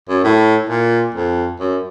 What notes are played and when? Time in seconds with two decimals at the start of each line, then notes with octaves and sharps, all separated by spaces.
0.09 F#2
0.24 A2
0.69 A#2
1.14 F2
1.60 F#2